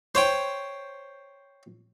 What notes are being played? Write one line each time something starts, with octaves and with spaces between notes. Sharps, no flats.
C5 C#5 G5